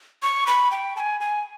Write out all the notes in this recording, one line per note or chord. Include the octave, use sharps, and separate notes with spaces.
C#6
B5
G5
A5
G#5
G#5